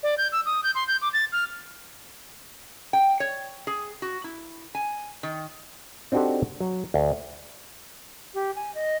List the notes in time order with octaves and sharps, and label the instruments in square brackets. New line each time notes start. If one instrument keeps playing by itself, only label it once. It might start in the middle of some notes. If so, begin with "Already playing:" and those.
[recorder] D5
G6
E6
D#6
G6
C6
G6
D6
A6
F6
[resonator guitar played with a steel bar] G5
C#5
G#4
F#4
E4
G#5
D#3
[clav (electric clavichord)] C4 D4 D#4 F#4 G4 A4
F#3
D2
[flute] G4
G#5
D#5